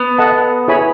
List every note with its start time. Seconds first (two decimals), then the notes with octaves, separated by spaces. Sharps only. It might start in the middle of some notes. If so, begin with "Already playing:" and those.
Already playing: B3
0.18 A4 D#5 F#5 A5
0.68 E4 G#4 C#5 G#5 B5